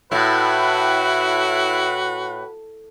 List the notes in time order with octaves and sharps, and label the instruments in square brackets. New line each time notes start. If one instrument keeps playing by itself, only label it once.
[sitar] A2 [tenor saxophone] E4 [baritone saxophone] F#4 [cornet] B4